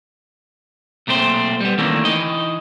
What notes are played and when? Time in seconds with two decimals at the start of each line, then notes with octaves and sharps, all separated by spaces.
1.07 B1 A#2 A3 C4 C5
1.60 G3 B3
1.78 D#3 E3 A3 A#3 C4 D4
2.05 E3 D#4 D#5